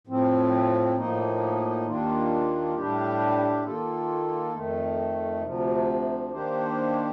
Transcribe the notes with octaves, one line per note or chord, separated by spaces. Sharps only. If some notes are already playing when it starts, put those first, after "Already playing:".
A2 F3 C4
A2 F3 A#3 D#4
D#2 D#3 A#3 D4 F4
A2 G3 D4 G4
D#3 A#3 F4 A4
F2 D#3 A3
D2 C3 F3
D#3 A#3 D4 G4 C5